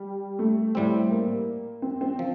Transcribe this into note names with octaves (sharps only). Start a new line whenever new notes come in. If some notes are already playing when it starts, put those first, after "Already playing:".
Already playing: G3
A3
A2 G3 C4
A#3
C4
C4
F3